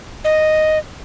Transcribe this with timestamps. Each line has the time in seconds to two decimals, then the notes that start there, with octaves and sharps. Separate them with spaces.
0.24 D#5